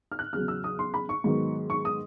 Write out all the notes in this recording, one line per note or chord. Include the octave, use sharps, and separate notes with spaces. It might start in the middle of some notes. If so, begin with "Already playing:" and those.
F6
F#6
E2 C#3 F#3 F6
E6
D#6
C6
B5
C#6
G#2 D#3 F#3 B3
C#6
D#6